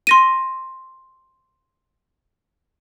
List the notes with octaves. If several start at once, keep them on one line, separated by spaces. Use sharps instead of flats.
C6 A#6 D#7